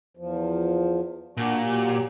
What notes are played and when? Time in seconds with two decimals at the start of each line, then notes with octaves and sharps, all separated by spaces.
0.17 E2 F3
1.37 A#2 D4 F#4
1.62 F#3 G4